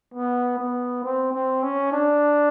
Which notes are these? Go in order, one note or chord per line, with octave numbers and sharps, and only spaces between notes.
B3
B3
C4
C4
C#4
D4